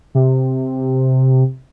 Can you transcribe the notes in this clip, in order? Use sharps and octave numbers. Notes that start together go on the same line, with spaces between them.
C3